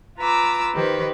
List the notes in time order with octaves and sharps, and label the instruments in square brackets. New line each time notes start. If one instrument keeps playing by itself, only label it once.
[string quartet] F4 B4 A#5 D6 E6
D#3 G4 B4 C5